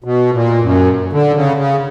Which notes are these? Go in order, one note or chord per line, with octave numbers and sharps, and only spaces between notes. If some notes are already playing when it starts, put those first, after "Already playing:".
B2
A#2
F#2
D3
C#3
C#3